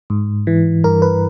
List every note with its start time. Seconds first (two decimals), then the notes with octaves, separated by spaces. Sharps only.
0.10 G#2
0.47 E3
0.84 G2 A#4
1.02 B4